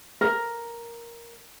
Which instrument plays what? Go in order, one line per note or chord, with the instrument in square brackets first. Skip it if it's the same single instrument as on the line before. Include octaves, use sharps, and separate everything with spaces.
[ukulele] A#4